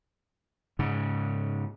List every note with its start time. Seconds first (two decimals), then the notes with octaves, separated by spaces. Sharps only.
0.79 G#2 C#3